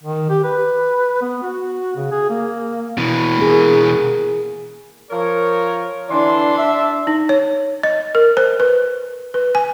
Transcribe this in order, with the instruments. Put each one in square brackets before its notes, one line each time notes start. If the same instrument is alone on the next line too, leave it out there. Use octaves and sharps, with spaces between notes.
[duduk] D#3
G4
B4
B3
F#4
C#3
G#4
A#3
[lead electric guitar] B2 E3
[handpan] A#3 G#4
[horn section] F3 A#4 C#5
[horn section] D3 E3 C6 [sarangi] D4
[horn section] E5
[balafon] D#4
C#5
D#5
A#4
C5
B4
B4
G#5